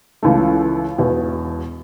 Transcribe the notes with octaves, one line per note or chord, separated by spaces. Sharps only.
C#2 C#3 E3 A3
E1 E2 B2